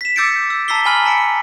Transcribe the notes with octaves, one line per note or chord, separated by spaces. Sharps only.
B6 E7
D6 E6 G6 A6 C#7 D7
E6
A5 A#5 E6 B6 C7 G7
G#5 B5 F6 F#7 G7
A5 B6 C#7 D7